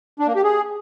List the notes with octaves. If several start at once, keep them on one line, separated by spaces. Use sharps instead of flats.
D4
A#3
G4
G#4